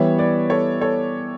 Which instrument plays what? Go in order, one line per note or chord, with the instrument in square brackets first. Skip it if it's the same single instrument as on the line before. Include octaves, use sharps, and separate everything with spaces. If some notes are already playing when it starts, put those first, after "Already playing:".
Already playing: [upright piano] E3 G3 B3 [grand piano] C#5 E5
[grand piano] B4 D5
A4 C#5
A4 C#5